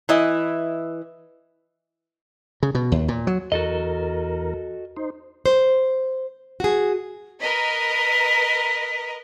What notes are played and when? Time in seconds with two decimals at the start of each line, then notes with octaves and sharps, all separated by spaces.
0.09 E3 E4 D#5
2.63 C#3
2.75 B2
2.92 D#2
3.08 A#2
3.27 F#3
3.52 E2 F#4 A4 A#4 D#5
4.97 D#4 C5
5.46 C5
6.60 F#4 G#4
7.41 A#4 B4 D#5 B6